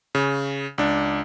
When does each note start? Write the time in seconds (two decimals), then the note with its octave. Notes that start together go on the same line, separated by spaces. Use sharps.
0.15 C#3
0.78 C#2 D4